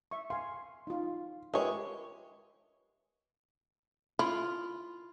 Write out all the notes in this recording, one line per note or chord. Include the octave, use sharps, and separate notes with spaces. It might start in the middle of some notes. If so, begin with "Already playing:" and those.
E5 C#6
F5 G#5 C6
D#4 F4
G#3 F4 G4 A#4 B4 C#5 E5
E4 F4